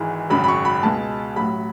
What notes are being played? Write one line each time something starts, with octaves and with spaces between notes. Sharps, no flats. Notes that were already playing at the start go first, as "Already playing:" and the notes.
Already playing: G#1 G#2 E3 G#3
G#1 F#2 C#3 F#3 B5
B5
C#6
B5
C#2 B2 G#3 A5
A1 A2 F#3 B5